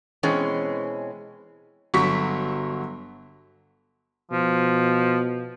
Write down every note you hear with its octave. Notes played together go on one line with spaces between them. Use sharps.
B2 E3 G#3 C4 C#4
G1 F#3 C#6 B6
B2 F3